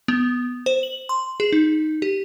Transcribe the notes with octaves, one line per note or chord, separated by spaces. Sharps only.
B3
C5
F#7
C6
G#4
D#4
G4